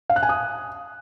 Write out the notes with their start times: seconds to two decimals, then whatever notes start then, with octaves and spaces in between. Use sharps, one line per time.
0.10 F5
0.16 F#6
0.23 G#5
0.29 D#6